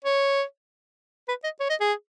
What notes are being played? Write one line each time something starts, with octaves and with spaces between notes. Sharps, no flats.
C#5
B4
D#5
C#5
D#5
G#4